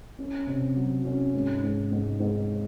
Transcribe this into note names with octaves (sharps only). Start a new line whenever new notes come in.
C#4
C3
F#3
C#4
G#2
G#2
G#2
G#2